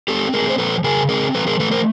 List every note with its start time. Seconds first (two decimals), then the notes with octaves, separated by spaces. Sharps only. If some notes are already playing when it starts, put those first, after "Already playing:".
0.08 C4 G4 A4
0.34 A3 G#4 A#4
0.49 C5
0.58 F3 A4 B4
0.84 C#3 G#4 A#4
1.09 C4 G#4 A#4
1.34 F3 A4 B4
1.47 G#4 A#4
1.59 A3 A4 B4
1.71 A#4 C5